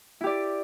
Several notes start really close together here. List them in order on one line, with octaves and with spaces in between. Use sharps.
E4 G4 D5